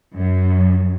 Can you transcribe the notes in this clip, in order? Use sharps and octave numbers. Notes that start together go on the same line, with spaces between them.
F#2